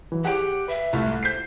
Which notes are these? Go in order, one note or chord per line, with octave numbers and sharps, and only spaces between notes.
E3 F#3
G4 G#4 C#5 F#5 G5
B4 E5
C2 A3 E4 F4 F6
G#3
C5 G6 B6 C7